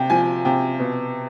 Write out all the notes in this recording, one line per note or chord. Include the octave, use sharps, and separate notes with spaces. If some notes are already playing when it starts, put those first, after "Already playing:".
Already playing: C3 G5
F3 G#5
C3 G5
B2